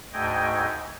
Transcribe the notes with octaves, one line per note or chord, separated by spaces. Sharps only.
D2 G#2 A3 D#5 G5 G#5